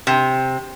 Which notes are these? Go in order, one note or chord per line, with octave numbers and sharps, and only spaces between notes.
C3